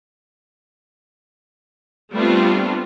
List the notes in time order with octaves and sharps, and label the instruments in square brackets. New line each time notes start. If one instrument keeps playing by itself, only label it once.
[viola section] G3 A3 B3 C4 D4 F4